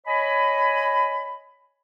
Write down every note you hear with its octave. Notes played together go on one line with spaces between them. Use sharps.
C#5 D#5 G#5 B5